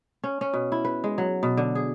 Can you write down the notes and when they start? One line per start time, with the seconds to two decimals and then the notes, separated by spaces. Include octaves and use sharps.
0.24 C#4
0.41 C#4
0.53 B2
0.72 E4
0.85 B4
1.04 G#3
1.18 F#3
1.43 B2
1.57 D3
1.75 G#4